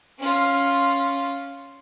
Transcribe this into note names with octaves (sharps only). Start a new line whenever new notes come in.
C#4 F4